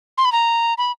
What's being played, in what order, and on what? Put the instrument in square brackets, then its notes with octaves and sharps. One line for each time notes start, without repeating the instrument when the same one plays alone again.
[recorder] C6
B5
A#5
B5